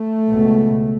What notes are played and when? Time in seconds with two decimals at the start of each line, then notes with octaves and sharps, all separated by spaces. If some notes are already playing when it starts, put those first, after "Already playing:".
Already playing: A3
0.30 C#2 B2